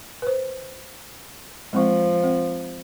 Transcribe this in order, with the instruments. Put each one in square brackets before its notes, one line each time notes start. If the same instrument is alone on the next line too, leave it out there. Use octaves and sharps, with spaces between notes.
[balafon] B4 C5
[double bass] F3 [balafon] G#3 C4 C#6
[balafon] C4